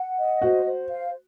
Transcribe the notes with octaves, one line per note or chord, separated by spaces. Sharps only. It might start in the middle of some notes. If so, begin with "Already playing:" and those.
Already playing: F#5
D#5
F#4 C5
C5
F5